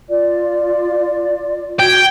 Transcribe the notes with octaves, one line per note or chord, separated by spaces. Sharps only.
F4 D5
F#4 G5 G#6